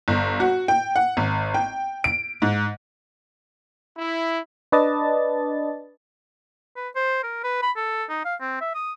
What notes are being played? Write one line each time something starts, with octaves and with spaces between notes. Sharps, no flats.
G1
F#4
G5
F#5
G#1
G5
D7
G#2
E4
D4 B4 D5 D#5 A5 A6
B4
C5
A#4
B4
B5
A4
D#4
F5
C4
E5
D#6